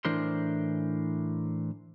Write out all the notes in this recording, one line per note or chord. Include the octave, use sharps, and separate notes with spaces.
A2 E3 D4 A#4 C5 C6